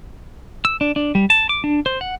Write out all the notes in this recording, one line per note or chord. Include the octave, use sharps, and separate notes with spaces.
E6
D4
D4
G3
A5
D6
D4
C5
F#5